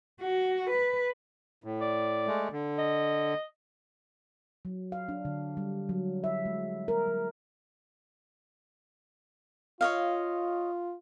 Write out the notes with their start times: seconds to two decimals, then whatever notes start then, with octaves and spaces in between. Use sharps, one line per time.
0.21 F#4
0.70 B4
1.64 A2
1.81 D5
2.27 G#3 A3
2.52 D3
2.79 D#5
4.65 F#3
4.92 F5
5.09 D4
5.25 D3
5.57 G3
5.89 F#3
6.24 E5
6.45 G#3
6.88 A#4
7.08 F#3
9.81 F4 C#5 D#5 F5